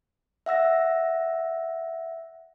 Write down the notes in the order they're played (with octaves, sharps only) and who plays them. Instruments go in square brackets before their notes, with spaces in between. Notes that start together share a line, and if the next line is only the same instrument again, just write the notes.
[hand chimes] E5 F#5 E6 A#6